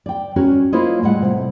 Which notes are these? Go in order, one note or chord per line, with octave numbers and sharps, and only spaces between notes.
D5 G5
C#4 F#4 A#4
A#3 E4 F4 C5 C#5 D#5
A2 G3 G#3 F#5
C3